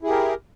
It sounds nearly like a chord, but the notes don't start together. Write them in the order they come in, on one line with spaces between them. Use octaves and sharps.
E4 G#4 G4 A#4